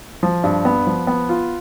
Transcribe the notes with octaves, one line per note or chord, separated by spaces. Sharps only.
F3
G2
B3
F3
B3
F4